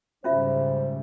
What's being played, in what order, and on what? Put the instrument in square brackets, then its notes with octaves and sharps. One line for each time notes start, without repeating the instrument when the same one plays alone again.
[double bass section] G#2 C#3 G3 [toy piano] C#4 F4 E5 [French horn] C5